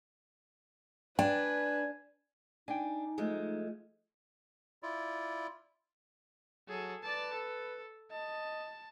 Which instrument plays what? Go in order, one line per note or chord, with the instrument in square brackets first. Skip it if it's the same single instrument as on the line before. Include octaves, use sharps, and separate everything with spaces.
[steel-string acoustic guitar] D4 [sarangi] B4 [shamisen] G5 [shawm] G#5
[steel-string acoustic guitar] D4 [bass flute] D#4 [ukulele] G5 G#5
[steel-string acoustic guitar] F3 G#3 A3
[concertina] E4 F4 D5
[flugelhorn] F#3 [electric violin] G#4 A4
[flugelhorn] B4 [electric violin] D5 A5
[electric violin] A4
[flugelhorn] D#5 [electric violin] A5